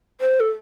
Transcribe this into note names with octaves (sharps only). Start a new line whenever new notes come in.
C5
A4